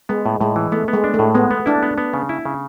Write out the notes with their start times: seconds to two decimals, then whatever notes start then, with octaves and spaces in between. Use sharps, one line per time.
0.09 G#3 B3
0.26 A2
0.41 A2 G#3
0.56 E3
0.72 A3 B3
0.88 B3
0.93 G#3
1.04 D4
1.14 A3
1.19 A2
1.35 G#3 B3
1.51 B3
1.66 D4 E4
1.83 B3
1.98 B3
2.14 C#3
2.29 E4
2.45 C#3